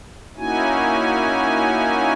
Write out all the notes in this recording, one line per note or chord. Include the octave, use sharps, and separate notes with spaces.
A#3 C#4 D#4 E4 F#4 G#5